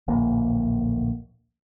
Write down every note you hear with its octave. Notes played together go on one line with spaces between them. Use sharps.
D1 A#1 A#3